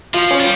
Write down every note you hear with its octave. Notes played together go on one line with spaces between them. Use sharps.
F3 F4
C#4
G3